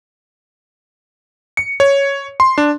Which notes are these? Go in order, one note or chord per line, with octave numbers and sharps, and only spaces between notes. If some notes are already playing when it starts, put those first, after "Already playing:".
C#7
C#5
C6
D4